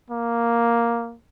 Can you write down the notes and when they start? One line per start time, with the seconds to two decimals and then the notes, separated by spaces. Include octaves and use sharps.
0.10 A#3